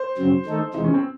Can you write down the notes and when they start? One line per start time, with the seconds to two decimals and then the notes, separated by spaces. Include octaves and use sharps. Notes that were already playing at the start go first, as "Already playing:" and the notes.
Already playing: C5
0.17 F#2 C#3 F#3 C4
0.45 D#3 A3 D#4 A4
0.74 E2 C3 E3 G#3 D#4
0.84 C#4
0.94 C4